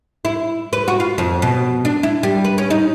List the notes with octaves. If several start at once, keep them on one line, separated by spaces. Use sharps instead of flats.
E4
B4
F#4
F4
F2
B2
D4
E4
G3
B4
C#4
D#4